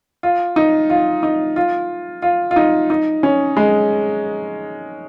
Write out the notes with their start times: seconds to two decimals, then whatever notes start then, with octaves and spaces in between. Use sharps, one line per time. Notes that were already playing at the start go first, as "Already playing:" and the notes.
0.23 F4
0.56 D#4
0.90 F4
1.23 D#4
1.56 F4
2.22 F4
2.51 F4
2.56 D#4
2.90 D#4
3.23 C#4
3.57 G#3